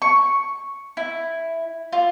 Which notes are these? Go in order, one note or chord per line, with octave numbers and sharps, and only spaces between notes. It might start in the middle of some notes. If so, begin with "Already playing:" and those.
C#6
E4
F4